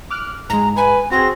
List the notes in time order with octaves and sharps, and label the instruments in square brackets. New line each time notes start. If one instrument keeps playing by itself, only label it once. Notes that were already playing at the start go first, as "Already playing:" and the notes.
[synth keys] D6 F6 F#6
[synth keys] G#2 G#3 [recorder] A#5
[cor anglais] B4 [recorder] G#5
[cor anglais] C4 [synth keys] F#4 G#4 [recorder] A#6